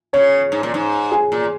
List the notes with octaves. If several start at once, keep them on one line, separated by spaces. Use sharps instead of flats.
C#3 C#5
G#2
A#2
G#2
G#4
A#2